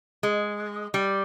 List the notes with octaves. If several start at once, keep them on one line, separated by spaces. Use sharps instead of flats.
G#3
G3